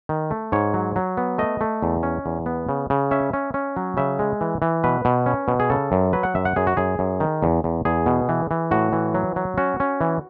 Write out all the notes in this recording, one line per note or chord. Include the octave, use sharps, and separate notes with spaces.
D#3
A3
G#2 C#5
F#3
F#3
B3
A3 D#5
A3
E2
C#4
E2
B3
C#3
C#3
C#4 E5
C#4
C#4
F#3
C#3 E5
G#3
E3
E3
B2 B4
B2
C#4
B2
G#4
C#3 A4
F#2
F#3 B4
F#5
F#2 E5
F#5
F#2 G#4
F#4
F#2 G#4
F#2
D#3
E2
E2
E2 G#4
B2
E3
E3
A2 F#4
E3
F#3
F#3
C#4 F#4
C#4
E3